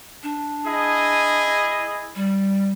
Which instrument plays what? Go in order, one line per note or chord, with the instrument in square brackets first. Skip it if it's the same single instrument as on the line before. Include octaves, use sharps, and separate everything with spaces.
[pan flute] D4
[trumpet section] E4 G#4 D#5
[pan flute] G3